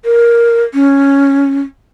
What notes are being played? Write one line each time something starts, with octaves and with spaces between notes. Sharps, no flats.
A#4
C#4